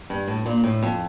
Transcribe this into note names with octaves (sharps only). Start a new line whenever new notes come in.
G2
A2
A#2
A2
F2